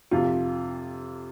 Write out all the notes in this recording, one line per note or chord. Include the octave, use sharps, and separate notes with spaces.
F2 C3 F3 F4